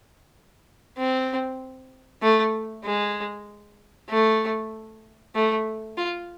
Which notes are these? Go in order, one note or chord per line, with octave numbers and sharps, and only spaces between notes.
C4
A3
G#3
A3
A3
F4